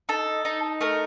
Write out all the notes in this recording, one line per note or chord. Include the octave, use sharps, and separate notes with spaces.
D#4 A4
D#4
A3 A#4